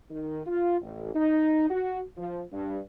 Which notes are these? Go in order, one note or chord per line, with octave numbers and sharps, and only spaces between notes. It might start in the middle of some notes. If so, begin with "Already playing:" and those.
D#3
F4
A1
D#4
F#4
F3
G2